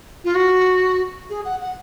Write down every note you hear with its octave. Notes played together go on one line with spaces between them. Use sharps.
F4
F#4
G#4
F#5
F#5